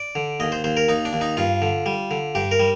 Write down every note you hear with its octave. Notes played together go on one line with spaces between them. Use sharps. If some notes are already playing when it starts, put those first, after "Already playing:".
Already playing: D5
D3
D#2 D#5
C5
D#2 C5
A#4
D#2 D#4
D4
D#2
D#4
G2 F4
D3
G3
D3
G2 G4
A#4
G3